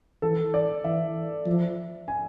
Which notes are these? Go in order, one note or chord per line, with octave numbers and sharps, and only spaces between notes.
E3 A4
D5
E3 E5
F3
G#5